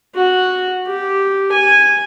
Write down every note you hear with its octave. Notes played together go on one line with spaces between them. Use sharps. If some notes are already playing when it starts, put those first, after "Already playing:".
F#4
G4
G#5